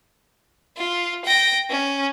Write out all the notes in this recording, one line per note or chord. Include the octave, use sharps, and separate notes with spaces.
F4
G5 A#6
C#4